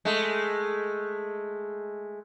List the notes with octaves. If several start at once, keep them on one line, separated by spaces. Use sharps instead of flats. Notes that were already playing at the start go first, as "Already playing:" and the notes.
G#3 A3